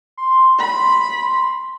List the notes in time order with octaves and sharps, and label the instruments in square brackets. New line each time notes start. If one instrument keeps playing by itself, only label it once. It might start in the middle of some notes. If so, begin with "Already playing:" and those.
[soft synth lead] C6
[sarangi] B5